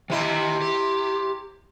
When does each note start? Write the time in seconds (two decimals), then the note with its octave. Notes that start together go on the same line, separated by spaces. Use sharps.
0.10 C3 D#3 E4 G4 D#5
0.62 G4